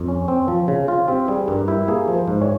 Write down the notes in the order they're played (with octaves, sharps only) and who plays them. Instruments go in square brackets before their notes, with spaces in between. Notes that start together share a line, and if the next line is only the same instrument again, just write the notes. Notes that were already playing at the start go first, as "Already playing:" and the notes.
Already playing: [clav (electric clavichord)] F2
C#4
C4
F3
C#3
F4
[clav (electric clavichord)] C4 [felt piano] G4
[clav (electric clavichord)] G3 [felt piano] G#4
[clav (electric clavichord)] G2 [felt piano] A#4
[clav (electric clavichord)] E4 [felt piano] G4
[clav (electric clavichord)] A#3 [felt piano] G#4
[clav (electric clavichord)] F3
[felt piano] C5
[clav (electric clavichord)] G#2
[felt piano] C#5